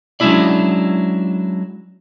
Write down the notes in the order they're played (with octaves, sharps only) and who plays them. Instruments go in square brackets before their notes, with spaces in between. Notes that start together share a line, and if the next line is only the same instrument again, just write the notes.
[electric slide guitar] F#3 G#3 C#4 D4 E4 D5